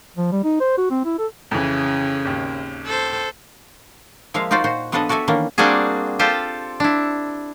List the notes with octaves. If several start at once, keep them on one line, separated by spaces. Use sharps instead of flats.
F3
G3
D#4
C5
F#4
C4
E4
A4
F2 C#3 E3
G#1 D#2
A4 C5
F3 G#3 A#3 E5 F5
D#4 F4 F#4 C5 D5
A#2 F#4 C5
F3 B3 D4 A4 B4 D#5
F#4 A4 D5 E5 G#5
D#3 E3 A#3 C#4 D4
G3 A#3 C4 D4 F#4 G#4
F4 G4 A4 C5 G5
D4 E4